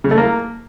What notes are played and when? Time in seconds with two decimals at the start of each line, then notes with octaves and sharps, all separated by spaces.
0.04 C#3
0.11 A3
0.18 A#3